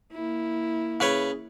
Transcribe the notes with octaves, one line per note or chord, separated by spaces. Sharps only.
A#3 E4
C#3 B4 C#5